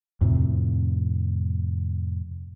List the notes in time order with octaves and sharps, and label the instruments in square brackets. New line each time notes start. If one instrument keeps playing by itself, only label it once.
[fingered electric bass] F2 A2 C3